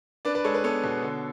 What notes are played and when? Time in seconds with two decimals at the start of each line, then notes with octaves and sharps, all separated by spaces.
0.25 D4 B4 D5
0.35 B4 D5
0.44 G#3 A4 C#5
0.54 B4
0.64 B3 A4 C#5
0.84 B2
1.02 D3